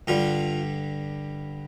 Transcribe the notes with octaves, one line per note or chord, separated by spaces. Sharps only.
G2 D3 G3 F4